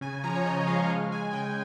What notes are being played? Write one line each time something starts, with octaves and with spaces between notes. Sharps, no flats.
C#3 G#5
F3 A#5
C#5
C#3 D#5
D#5
G#3 F5
G#3
G#3 G#5
C#3 G5